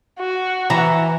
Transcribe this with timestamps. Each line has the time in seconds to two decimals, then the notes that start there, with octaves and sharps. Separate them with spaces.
0.19 F#4
0.70 E3 A#5